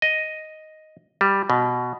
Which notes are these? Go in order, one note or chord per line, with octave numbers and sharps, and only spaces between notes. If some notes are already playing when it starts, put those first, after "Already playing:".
D#5
G3
B2